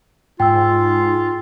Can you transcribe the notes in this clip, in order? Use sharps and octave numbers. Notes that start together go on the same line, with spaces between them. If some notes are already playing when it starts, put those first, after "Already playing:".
G#2 F4 G5 E6